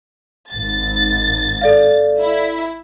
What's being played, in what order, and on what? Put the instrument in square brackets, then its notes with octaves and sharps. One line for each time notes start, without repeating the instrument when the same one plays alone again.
[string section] G#1 A6
[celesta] A4 D5 F5
[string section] E4